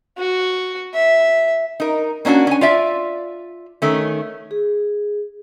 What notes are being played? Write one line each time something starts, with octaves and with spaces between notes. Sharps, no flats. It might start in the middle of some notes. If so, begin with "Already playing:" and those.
F#4
E5
D#4 A#4
A#3 C#4 D4 E4 F#4
C#4 G#5
F4 D5 E5
D#3 A3 C#4
G#4